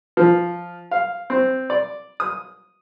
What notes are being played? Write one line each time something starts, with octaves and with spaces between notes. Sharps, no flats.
F3
F5
C4
D5
D#6